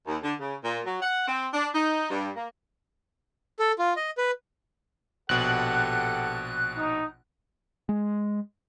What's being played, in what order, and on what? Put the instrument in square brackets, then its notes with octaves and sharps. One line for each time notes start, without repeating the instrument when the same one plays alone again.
[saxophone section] D#2
D3
C#3
A#2
F#3
F#5
C4
D4
D#4
G2
A#3
[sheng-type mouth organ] A4
F4
D#5
B4
[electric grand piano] A#1 B2 [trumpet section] G4 A4 F#5 [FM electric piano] F#6
[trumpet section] D#4
[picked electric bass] G#3